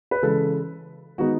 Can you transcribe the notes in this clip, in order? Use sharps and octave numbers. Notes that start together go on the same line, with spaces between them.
B4
C#3 E3 G#3 A4
D#3 G#3 B3 D#4 F#4